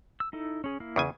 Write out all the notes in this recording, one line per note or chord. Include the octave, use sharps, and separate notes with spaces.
E6
D#4 E4 A4
C#4 G#4
A#3 E4 F5
E2 C#3 G#5